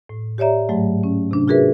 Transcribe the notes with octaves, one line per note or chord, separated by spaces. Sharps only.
A2
G4 C#5 D5 E5 A#5
G#2 F#3 A3
C#4
C3 D4
F4 F#4 G#4 A#4 B4 E5